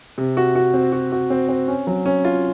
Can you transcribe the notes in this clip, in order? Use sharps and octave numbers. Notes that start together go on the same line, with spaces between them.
C3
F#4
F#4
C4
F#4
F#4
C4
C4
C#4
F#3
C#4
F4